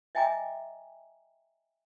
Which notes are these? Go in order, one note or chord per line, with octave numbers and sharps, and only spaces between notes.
D#5 E5 G5 G#5 A#5 D6